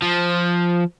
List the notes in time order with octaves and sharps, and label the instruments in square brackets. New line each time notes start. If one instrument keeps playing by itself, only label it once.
[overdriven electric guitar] F3